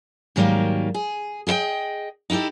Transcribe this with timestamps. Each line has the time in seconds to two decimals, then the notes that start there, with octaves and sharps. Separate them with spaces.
0.36 G#2 D#3 F#3 G3 A3 A#3
0.94 G#4
1.47 G#4 A#4 D5 D#5 G5
2.30 D#4 E4 F#4 G4 A4